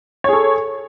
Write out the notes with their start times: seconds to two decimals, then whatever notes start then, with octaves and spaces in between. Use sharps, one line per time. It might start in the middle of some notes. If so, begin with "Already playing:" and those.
0.24 C#5
0.29 G#4
0.33 A4